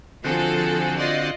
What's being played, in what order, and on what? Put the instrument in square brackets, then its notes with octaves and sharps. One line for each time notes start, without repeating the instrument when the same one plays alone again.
[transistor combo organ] D3 C4 F#4 [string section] F3 G#4 A4
[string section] F4 D5 D#5